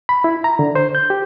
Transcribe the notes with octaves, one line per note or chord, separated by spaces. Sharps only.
B5
E4
A#5
D3
C5
G6
G4